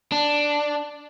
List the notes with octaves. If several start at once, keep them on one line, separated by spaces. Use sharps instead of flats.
D4